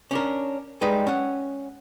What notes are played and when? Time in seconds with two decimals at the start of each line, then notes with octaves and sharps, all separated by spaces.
0.11 C#4 D4 A#4
0.81 G3 G#3 D#4 B4
1.07 C#4 F#5